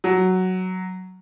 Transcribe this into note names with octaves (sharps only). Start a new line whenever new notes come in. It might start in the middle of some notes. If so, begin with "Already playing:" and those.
F#3